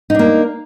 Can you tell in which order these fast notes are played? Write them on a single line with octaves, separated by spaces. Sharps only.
D#4 D4 A#3